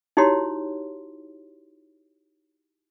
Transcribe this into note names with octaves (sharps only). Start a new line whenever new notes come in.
D#4 E4 F#4 G4 C#5 C6